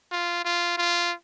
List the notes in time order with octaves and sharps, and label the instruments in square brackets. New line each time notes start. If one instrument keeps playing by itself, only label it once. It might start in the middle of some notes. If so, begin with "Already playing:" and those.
[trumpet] F4
F4
F4